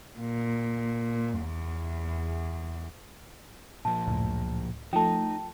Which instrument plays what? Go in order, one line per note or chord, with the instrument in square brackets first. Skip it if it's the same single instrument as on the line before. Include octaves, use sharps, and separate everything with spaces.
[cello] A#2
E2
[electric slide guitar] A#2 F3 [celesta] A5
[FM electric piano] C#2 F#2 A2
[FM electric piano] F3 A3 [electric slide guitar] D#4 [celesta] G5 A5